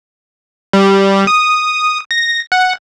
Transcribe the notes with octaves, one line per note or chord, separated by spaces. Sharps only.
G3
D#6
A#6
F#5